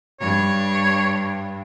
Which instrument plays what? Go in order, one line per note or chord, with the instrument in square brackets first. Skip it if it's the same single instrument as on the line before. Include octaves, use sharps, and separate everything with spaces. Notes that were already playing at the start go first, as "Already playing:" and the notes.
[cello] G2 [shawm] C#5